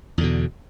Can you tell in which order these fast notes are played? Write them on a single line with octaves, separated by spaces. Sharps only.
E2 D3 B2